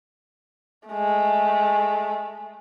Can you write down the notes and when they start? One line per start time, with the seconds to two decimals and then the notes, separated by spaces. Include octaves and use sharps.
0.89 G#3 A3